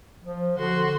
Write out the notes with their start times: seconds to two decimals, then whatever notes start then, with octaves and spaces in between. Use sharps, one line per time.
0.24 F3
0.58 D3 F#4 C6